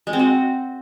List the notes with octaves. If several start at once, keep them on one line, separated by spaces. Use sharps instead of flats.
G#3
C4
F#4